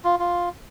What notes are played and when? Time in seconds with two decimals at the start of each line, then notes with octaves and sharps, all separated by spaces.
0.04 F4
0.19 F4